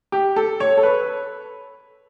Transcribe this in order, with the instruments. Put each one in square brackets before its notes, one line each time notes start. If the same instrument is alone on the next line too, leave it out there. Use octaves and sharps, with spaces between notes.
[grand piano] G4
A4
C#5
A4
B4